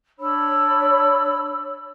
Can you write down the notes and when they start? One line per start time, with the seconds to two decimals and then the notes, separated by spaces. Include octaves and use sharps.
0.18 D4 C#5 B5 E6